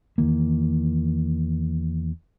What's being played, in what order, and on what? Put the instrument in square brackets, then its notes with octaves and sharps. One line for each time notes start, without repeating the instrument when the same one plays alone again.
[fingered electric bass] E2 D#3 E3 A#3